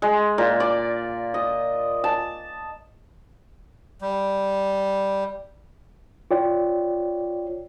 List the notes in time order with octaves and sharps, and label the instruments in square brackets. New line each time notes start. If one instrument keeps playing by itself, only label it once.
[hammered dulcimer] G#3
A#2
D5
D#5
A5
[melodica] G3
[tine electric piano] F4 C#5 D5 G5